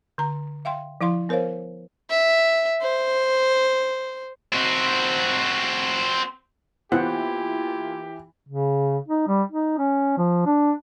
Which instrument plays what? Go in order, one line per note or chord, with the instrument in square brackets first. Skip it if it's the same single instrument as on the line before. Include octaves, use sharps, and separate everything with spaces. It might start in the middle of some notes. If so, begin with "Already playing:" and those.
[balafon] D3 A#5
E5 F5 G5 C6
F3 E4 F5 C6
B3 A#4 C5 C#5 F5
[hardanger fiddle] E5
C5
[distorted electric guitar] C4 F#4
[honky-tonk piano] E3 [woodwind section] A#3 E4 F4 [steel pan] B3 C5 F#5 [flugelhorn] G4
[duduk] C#3
D#4
G3
D#4
C#4
F3
D4